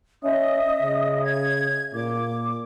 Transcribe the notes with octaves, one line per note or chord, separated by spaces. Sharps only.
C#4 D#5 E5 D#6
C#3
G#6
A#2 D6